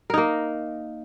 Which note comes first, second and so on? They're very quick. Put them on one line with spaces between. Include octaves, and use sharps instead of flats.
A#4 D#4 A#3